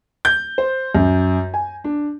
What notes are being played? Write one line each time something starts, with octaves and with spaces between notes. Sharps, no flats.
G6
C5
F#2
G#5
D4